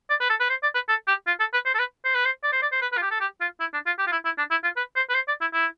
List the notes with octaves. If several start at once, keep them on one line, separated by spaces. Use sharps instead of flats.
D5
B4
A4
B4
C5
D5
B4
A4
G4
F4
A4
B4
C5
A4
B4
C5
B4
C5
D5
C5
D5
C5
B4
B4
F4
G4
A4
G4
F4
E4
D4
F4
G4
F4
E4
E4
D4
E4
F4
B4
C5
B4
C5
D5
E4
E4